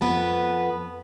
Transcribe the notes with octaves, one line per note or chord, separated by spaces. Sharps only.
F2 B3 B4 A5